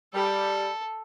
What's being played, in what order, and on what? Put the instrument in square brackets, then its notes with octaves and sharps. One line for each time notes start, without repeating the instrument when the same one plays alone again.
[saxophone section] G3 [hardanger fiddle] A4